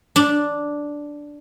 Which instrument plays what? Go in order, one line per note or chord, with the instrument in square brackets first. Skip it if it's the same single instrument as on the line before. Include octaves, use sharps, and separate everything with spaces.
[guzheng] D4